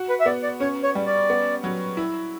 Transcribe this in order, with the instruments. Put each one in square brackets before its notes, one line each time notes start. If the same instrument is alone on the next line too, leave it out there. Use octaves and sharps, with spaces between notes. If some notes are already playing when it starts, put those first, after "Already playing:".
Already playing: [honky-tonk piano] F#4
[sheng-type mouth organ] B4
E5
[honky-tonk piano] B3 [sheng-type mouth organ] D5
[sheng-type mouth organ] D5
[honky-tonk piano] C#4 [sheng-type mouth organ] C#5
[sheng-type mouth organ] C#5
[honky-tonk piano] G3
[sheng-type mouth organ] D5
[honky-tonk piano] B3
F#3
E4